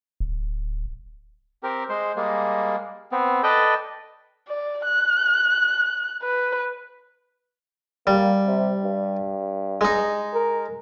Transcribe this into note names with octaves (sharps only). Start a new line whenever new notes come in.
D1
C4 G4 A#4
G#3 C5
G3 G#3 A#3
B3 C4
A4 B4 D5 D#5 G5
D5
F#6
B4
G3 A#3
C3
G2
G#3 D#4
A#4